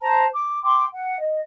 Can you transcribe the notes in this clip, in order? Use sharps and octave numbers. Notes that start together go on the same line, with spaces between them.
C5 A5 A#5
D6
G5 C6 D6
F#5
D#5